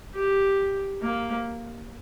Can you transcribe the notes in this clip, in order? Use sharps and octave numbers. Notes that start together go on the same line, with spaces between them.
G4
A#3